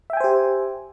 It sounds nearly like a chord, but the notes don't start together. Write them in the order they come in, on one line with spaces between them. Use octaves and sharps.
E5 G5 G#5 C5 G4